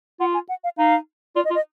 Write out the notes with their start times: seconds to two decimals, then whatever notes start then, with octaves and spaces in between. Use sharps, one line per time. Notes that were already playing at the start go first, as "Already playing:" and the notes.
0.20 F4 F#5
0.34 G#5
0.49 F#5
0.64 F5
0.78 D#4 F5
1.36 F4 D5
1.45 D#5
1.50 F4
1.55 D#5